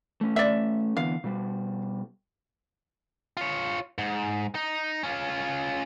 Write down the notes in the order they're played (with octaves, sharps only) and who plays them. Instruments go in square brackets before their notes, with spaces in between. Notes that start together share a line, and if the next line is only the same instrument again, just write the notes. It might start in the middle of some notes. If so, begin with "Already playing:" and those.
[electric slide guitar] A3 C#4
[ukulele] D5 E5
[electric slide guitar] D3 E3 B3 [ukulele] F5
[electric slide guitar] B2 G3
[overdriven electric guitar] F4 C#5
G#2
D#4
C#4 F4